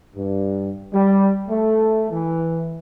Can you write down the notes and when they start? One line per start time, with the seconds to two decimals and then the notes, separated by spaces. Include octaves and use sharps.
0.16 G2
0.93 G3
1.49 A3
2.09 E3